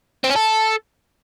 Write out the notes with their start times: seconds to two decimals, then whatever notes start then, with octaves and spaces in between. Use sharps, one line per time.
0.24 C4
0.30 C#4
0.36 A4